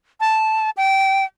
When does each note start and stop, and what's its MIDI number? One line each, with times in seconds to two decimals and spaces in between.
0.20 0.70 81
0.77 1.25 79